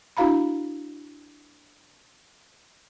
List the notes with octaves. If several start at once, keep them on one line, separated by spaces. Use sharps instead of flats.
D4 E4 F#4 F5 A#5 B5